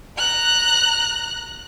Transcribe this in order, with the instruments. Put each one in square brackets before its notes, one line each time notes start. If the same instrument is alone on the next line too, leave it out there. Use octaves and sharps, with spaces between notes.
[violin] A#5 F#6